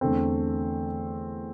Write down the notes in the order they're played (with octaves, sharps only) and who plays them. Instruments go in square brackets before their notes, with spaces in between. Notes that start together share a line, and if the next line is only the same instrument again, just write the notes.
[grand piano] E2 D3 A3 C4